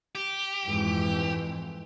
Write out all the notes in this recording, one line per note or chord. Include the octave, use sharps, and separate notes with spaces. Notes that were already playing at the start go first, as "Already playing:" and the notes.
G4
F2 G#2 E3